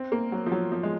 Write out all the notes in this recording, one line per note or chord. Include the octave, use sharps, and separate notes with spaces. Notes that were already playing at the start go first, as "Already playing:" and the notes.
Already playing: C4
A#3
F#3
F3
F#3
F3
G#3